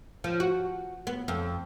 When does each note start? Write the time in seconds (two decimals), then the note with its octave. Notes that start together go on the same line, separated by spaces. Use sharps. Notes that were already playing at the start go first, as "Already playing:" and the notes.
0.24 F3
0.40 F#4
1.07 B3
1.28 F2